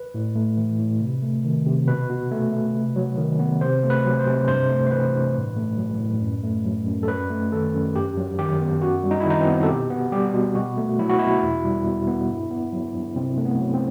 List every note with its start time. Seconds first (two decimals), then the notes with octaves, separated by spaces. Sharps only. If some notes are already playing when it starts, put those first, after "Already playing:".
Already playing: B4
0.14 A2
0.35 A3
0.58 E3
0.79 A2
1.01 C3
1.22 A3
1.44 D#3
1.66 C3
1.88 B2 B4
2.09 B2
2.31 A3
2.52 A3
2.75 C3
2.96 F#3
3.17 D#3
3.39 B3
3.61 C3 C5
3.83 A3
3.90 B4
4.04 F#3
4.19 C5
4.27 C3
4.48 G2 C5
4.69 A3
4.87 C5
4.91 E3 B4
5.13 G2
5.35 A2
5.57 A3
5.78 F#3
6.00 A2
6.22 F#2
6.43 A3
6.65 F#3
6.86 F#2
7.03 A4
7.08 F#2 B4
7.30 A3
7.52 D#3 A4
7.74 F#2
7.95 G2 G4
8.17 F#3
8.39 D#3 G4
8.61 B3
8.82 F#2 F#4
9.03 G3
9.11 D#4
9.20 D#3 E4
9.30 D#4
9.40 C4
9.47 B3
9.63 A4
9.68 B2 G4
9.90 B3
10.12 G3 G4
10.34 B2
10.55 B2 F#4
10.77 A3
10.99 F#3 E4
11.09 F#4
11.19 B2 E4
11.42 E2
11.64 G3
11.86 B2
12.08 B3
12.29 G2
12.51 B3
12.72 F#3
12.94 G2
13.16 C3 C4
13.38 A3
13.45 B3
13.59 F#3
13.74 C4